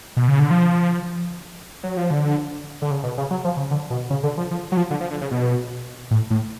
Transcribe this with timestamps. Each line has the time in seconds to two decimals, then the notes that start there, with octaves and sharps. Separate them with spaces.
0.17 B2
0.28 C#3
0.39 D3
0.51 F3
1.83 F#3
1.97 F3
2.11 D3
2.82 D3
2.91 C#3
3.03 B2
3.18 C#3
3.31 F#3
3.44 F3
3.57 C#3
3.71 D3
3.90 B2
4.10 C#3
4.23 D3
4.37 F3
4.51 F3
4.72 F#3
4.77 F3
4.91 D3
5.01 F3
5.11 D3
5.21 C#3
5.31 B2
6.11 A2
6.30 A2